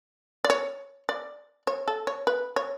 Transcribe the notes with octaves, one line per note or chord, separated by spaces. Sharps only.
D5
C#5
D5
C#5
A4
C#5
B4
C#5